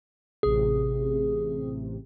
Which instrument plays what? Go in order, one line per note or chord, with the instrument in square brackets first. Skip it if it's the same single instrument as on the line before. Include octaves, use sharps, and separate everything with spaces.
[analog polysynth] A1 C3 [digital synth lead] G#4